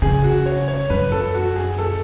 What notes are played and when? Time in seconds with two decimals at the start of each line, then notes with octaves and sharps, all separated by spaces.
0.02 C#3 G#4
0.24 F#4
0.46 C#5
0.68 C#5
0.90 F#2 B4
1.12 A4
1.35 F#4
1.56 G#4
1.78 A4